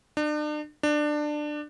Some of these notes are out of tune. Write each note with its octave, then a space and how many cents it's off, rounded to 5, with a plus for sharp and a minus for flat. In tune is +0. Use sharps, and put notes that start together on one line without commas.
D4 +40
D4 +20